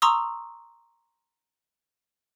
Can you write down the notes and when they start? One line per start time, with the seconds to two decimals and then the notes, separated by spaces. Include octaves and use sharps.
0.02 A#5 C6 C#6 D#6 E6